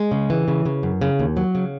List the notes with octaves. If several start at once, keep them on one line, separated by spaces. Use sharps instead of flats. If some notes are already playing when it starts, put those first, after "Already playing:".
Already playing: G#3
C#3
E3
C#3
C#3
F#2
C#3
D#2
F#3
C#3